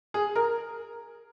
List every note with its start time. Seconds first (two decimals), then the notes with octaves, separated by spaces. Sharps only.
0.14 G#4
0.36 A#4